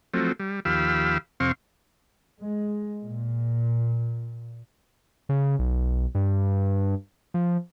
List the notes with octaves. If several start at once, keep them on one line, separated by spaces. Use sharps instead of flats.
F3 F#3 A3 C4
G3
D#2 F3 G4 F5 B5 E6
F2 C3 C4 F5 C6 C#6
G#3
A#2
C#3
B1
G2
F3